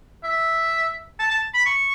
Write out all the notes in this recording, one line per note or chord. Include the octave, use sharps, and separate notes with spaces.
E5
A5
A5
B5
C#6